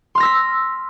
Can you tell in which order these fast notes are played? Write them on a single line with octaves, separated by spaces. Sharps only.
C6 F6 A#6 E6 B6